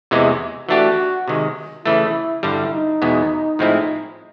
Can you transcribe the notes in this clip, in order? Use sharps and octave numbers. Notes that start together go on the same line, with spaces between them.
E2 C3 E3 G#3
E3 A3 D4 F#4 G4
C3 D#3 G#3
C#3 E3 A3 E4
G2 D3 G3 E4
D#4
E2 B2 G#3 B3
A2 F3 G#3 C4 E4